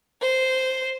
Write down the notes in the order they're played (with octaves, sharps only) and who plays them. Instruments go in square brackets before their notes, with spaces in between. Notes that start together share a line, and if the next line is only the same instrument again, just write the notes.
[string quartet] C5